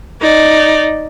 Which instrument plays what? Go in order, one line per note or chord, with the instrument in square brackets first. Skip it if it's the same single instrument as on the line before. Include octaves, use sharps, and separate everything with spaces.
[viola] D#4 D5